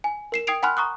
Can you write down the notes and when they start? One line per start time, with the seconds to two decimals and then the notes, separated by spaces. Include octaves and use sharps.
0.04 G#5
0.32 A#4 C7 E7
0.47 G5 D#6 G#6 C7 D7 F7
0.63 F#5 G#5 B5 C6 F6 F#6
0.77 A#5 C#6 D#6 F#6